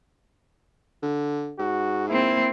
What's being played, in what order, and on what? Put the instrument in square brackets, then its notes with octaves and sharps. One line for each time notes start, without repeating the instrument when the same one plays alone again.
[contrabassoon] D3
[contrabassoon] G#2 [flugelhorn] F#4
[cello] A#3 C4 [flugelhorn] E4